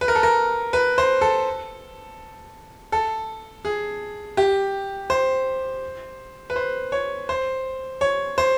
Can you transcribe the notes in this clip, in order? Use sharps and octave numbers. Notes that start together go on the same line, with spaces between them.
B4
A#4
A4
A#4
B4
C5
A4
A4
G#4
G4
C5
B4
C5
C#5
C5
C#5
C5